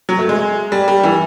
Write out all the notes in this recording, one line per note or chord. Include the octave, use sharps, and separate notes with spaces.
F#3
A3
G#3
G3
G3
E3